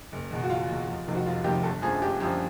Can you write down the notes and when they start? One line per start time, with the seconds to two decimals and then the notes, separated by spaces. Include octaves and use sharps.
0.12 F#1
0.31 E2 B2
0.43 F#4
0.50 F#1 F4
0.68 E2 B2
0.88 F1
1.07 F2 C3 D#3
1.15 F#4
1.26 F1 F4
1.44 F2 C3 D#3 G4
1.63 G1 A4
1.82 F#2 D3 F3 G#4
2.02 G1 G4
2.20 F#2 D3 F3 G4